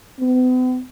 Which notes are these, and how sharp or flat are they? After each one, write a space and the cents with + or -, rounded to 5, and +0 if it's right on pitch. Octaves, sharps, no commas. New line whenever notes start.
B3 +45